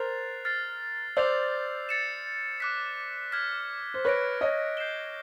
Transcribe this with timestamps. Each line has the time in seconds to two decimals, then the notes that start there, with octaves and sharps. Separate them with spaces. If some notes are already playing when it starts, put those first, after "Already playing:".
Already playing: A#4 C5 F#6 A6 C7 F7
0.45 F6 A6 C7
1.17 C5 D5 E6 G6 C7 F7
1.89 A6 C#7 E7
2.60 D6 F#6 B6
3.32 F6 G#6 B6
3.94 C5
4.04 B4 C#5 F#6 A#6 D7
4.41 C#5 D#5
4.77 G6 C7 E7 G7